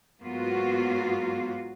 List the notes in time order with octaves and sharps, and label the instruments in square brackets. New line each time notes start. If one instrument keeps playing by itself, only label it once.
[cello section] G#2 F#3 A#3 B3 F4 F#4